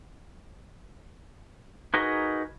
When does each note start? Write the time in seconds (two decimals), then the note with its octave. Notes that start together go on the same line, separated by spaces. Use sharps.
1.94 D#4 F#4 G#4 A#4 B4 D#5